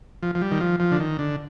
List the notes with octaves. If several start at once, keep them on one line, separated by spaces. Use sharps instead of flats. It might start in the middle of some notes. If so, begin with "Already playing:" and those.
F3
F3
G3
D#3
F3
F3
D3
D#3
D3